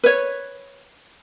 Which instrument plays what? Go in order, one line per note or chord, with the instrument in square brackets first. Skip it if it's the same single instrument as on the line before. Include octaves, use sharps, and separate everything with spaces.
[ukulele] B4 C#5